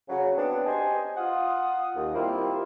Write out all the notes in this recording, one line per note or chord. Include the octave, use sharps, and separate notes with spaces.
C#3 F#3
B3 C4 D4
G4 C5 D#5 G#5
F4 F#5 D#6
D#2
D#3 G3 A#3 C4 E4 F4